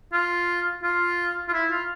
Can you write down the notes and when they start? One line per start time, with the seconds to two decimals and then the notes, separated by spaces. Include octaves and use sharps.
0.13 F4
0.83 F4
1.48 F4
1.53 E4
1.71 F4